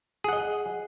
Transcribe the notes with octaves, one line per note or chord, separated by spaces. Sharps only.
G#4 D#5 F#5